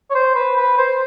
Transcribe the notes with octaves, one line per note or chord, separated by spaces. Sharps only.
C#5
C5
B4
B4
C5